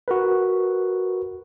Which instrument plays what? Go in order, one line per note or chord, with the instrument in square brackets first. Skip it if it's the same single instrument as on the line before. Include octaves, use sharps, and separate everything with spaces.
[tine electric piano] F#4 A#4 B4